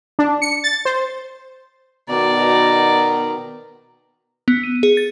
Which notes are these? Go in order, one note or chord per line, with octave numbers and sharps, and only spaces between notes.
D4
C#7
A6
C5
B2 D#3 D5 A#5
B3
D#7
G#4
A6